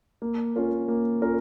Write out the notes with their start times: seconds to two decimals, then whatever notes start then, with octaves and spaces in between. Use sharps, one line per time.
0.22 A#3
0.56 C#4 F4 A#4
0.88 A#3
1.22 C#4 F4 A#4